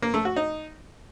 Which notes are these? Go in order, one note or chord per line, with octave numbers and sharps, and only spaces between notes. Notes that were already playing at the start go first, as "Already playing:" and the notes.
A#3
A3
F#4
D#4